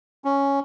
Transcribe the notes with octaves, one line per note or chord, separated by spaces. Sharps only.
C#4